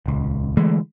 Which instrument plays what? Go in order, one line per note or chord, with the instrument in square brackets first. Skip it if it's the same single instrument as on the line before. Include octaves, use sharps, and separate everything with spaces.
[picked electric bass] D#1 C#2
D3 E3 G#3 A3